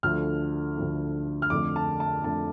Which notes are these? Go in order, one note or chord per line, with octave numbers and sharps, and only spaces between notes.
D2 D3 F3 A3 F6
D2 D3 F3 A3
F6
F2 D3 A3 D6
A5
A5
F2 D3 A3 A5